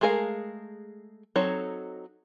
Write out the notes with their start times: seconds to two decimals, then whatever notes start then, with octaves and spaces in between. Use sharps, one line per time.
0.01 G#3 A3 G#4 A#4 F5
1.36 F#3 C4 D#4 A4 C#5